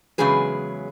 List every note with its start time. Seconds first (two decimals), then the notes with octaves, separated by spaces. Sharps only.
0.18 E2 C#3 F#3 G#3 G#4 B4